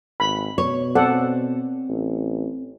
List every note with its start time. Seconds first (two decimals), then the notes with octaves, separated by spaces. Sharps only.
0.20 G#1 B5
0.58 B2 C#5
0.95 C4 A4 D5 F#5
1.89 A1